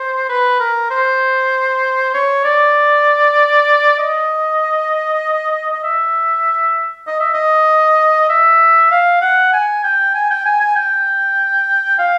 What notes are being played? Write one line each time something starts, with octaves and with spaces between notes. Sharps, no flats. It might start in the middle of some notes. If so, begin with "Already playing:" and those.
Already playing: C5
B4
A#4
C5
C#5
D5
D#5
D#5
E5
D#5
E5
D#5
E5
F5
F#5
G#5
G5
G#5
G5
G#5
G#5
G5
F5